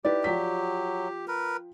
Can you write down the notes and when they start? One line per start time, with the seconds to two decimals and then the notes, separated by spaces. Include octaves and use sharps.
0.05 D#4 E4 G4 B4 D5
0.24 F3 F#3 G5 B6
1.28 A#4 B4